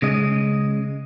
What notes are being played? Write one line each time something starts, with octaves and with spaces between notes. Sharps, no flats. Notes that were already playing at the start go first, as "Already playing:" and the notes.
C#3 G#3 D#5